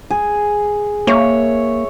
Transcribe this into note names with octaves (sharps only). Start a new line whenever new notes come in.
G#4
A#3 C#5 E5